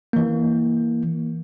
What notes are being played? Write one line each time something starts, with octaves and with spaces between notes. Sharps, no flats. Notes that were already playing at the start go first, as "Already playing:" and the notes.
E3 A#3